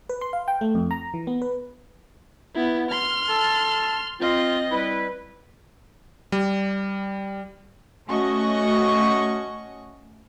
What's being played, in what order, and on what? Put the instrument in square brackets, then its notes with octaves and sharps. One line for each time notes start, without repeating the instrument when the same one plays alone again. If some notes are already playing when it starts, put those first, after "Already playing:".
[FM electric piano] B4
C6
F5
G5
A3
F2
A#5
E3
B3
B4
[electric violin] B3 E4
C6 F6
[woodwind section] A4 A5
[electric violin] C4 D#5 [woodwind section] F4
[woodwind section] G3 E4 B4
[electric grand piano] G3
[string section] A3 C#4 F#4 D#5 C#6